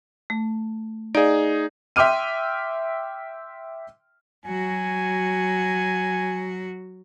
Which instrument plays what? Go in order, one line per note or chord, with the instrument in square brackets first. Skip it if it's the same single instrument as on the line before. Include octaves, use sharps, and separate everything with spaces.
[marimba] A3
[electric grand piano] D#4 G#4 [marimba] D5 F5
[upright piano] E5 G5 C6 D6 F6 D#7
[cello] F#3 F#4 [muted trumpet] G#5